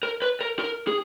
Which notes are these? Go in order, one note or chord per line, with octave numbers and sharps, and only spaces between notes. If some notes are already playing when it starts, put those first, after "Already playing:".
A#4
B4
A#4
A#4
G#4